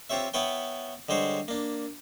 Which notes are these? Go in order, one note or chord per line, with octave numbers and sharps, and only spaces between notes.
C4 F4 G4 C#5 E5
B3 E4 B4 C#5 G5
D3 G3 G#3 C5 C#5
A#3 D4